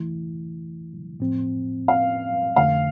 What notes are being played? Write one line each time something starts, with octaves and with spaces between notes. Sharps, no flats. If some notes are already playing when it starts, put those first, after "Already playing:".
Already playing: E3 A3 E4
A2 F3 C4
F5
F2 D3 A3 F5